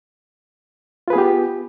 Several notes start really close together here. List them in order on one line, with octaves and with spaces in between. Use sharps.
F4 B4 G#4 B3 G4